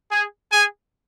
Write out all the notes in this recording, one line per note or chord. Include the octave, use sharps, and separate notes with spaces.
G#4 G#5
G#4 G#5